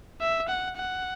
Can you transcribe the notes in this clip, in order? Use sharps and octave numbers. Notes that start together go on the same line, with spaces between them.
E5
F#5
F#5